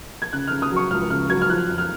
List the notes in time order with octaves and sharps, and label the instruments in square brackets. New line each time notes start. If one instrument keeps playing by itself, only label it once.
[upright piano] G#6
C#3 F#6
C#3 F6
D#6
F#3 C#6
C#2 F6
C#3 F6
F#3 G#6
F6
F3 F#6
F2
F6